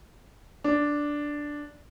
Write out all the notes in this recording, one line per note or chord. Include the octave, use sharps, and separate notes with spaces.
D4